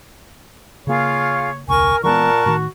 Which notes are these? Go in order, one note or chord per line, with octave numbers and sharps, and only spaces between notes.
C#3 A#3 F4 G#4 C#5 F5
E1 C#2 A#4 G#5 C#6
A#2 E3 G#3 B3 A#4 F#5 A5 C#6
A2 D#3 F#4